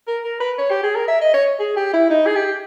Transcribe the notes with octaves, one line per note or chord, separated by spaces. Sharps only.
A#4
A#4
B4
C#5
G4
G#4
A#4
E5
D#5
C#5
G#4
G4
E4
D#4
G#4
G4